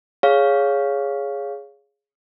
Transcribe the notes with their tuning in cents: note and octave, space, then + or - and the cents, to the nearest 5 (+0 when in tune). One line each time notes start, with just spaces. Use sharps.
G#4 +0 C#5 +10 F5 +0